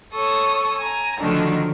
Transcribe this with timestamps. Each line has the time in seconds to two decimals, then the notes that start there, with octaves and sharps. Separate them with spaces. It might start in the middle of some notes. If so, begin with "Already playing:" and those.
0.13 A4 C#5 C#6 D#6
0.78 G#5 A#5
1.19 D3 D#3 F3 F#3 A3 D4